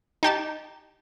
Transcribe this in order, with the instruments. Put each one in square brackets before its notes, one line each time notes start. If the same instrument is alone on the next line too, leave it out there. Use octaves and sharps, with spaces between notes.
[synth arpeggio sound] D#4 G4 A5